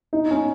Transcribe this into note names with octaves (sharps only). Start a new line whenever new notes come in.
D#4
C#4